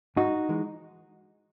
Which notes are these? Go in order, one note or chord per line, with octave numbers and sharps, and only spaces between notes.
G#2 D#4 F#4
E3 G#3